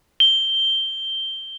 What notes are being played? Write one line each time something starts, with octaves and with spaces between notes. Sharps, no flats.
G7